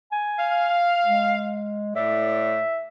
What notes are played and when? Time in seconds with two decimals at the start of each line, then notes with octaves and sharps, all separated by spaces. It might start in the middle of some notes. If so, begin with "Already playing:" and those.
0.12 G#5
0.38 F5
1.05 G#3
1.96 A2 D5 E5